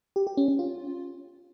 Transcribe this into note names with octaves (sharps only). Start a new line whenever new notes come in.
G4
G4
C#4
C#4
F4